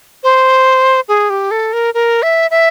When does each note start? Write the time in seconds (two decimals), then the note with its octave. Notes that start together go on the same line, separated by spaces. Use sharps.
0.23 C5
1.08 G#4
1.30 G4
1.51 A4
1.73 A#4
1.94 A#4
2.23 E5
2.51 E5